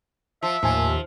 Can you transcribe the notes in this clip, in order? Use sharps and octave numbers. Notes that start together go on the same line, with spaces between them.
F3 E5
D#2 A2 F3 G#5